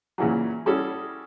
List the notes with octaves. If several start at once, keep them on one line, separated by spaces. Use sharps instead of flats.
A#2 C#3 E3 F#3
G3 C#4 E4 F#4 G#4 A4